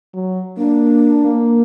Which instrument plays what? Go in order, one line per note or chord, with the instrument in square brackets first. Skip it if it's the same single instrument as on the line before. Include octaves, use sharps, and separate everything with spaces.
[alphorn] F#3
[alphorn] A#3 [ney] D4
[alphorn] A#3